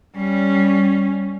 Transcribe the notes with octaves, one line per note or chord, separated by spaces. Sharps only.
G3 C#4